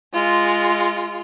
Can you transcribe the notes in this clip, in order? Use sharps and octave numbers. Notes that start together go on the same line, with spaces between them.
G#3 F4